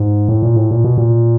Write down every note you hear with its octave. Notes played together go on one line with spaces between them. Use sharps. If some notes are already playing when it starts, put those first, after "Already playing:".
Already playing: G#2
A2
A#2
A2
A#2
B2
A#2